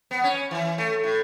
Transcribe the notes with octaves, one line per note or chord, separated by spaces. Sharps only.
B3
C#4
E3
A3
A2